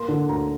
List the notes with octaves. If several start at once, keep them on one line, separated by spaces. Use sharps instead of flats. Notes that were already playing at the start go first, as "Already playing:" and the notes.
Already playing: A#3 C6
D3
D2 A#5